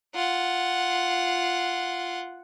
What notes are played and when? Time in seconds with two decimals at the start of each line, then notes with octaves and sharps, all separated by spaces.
0.15 F4 F#5